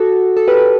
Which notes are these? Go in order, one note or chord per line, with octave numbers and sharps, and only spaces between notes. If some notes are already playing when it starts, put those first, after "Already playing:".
Already playing: F#4 A4
A4
G4 B4